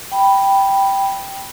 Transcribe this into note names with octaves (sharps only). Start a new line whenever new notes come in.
G5 B5